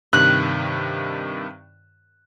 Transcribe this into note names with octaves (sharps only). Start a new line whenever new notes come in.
G2 C3 D#3 F#6